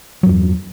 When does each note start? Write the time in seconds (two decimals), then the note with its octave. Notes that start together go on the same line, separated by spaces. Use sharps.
0.23 F#3
0.26 G2
0.29 E2